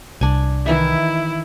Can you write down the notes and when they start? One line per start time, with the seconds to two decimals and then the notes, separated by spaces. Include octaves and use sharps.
0.21 C2 D4 G#5
0.66 D#3 E3 E4 E5